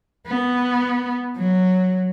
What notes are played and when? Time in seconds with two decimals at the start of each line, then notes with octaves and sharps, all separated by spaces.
0.27 B3
1.37 F#3